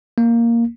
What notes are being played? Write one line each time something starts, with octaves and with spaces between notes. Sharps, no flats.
A#3